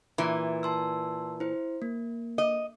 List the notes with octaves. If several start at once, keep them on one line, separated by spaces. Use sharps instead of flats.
A#2 E3
A5 C6 E6
E4 C5
A#3
D#5